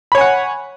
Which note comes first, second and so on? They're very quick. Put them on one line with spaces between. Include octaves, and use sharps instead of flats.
B5 C#5 G#5 F#5